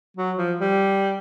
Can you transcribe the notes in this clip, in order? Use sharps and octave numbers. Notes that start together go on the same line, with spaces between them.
F#3
F3
G3